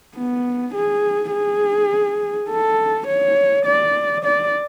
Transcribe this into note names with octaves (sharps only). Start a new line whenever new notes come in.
B3
G#4
G#4
A4
C#5
D5
D5